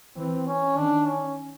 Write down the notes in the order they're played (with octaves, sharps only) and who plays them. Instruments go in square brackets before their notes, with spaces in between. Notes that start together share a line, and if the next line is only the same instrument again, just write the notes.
[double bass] E3 [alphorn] C4
[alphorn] C#4
[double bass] D#3 [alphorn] D4
[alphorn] C#4